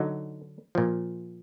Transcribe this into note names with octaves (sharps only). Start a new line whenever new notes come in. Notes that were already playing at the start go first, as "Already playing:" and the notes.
Already playing: D3 F#3 D#4
A#2 F3